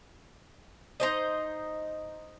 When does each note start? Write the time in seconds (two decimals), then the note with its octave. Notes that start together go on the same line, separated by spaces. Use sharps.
1.00 D#4 C5 D#5